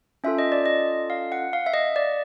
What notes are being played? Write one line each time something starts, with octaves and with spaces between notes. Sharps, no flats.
C#4 F4 A4 E5
D#5
D5
D#5
F5
F#5
F5
E5
D#5
D5